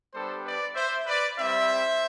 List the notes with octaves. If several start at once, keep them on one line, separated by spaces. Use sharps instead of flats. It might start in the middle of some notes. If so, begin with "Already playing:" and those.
G3 B3 D4 G4 A4 C5
B4 D5
C5 E5
B4 D5
G3 C4 E4 C5 E5